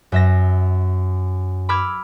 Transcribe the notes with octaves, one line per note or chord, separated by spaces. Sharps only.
F#2 E5 A#6
B5 D6 E6 F6 G#6